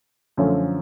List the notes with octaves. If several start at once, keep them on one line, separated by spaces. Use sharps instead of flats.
F#2 D3 F3 A3 C#4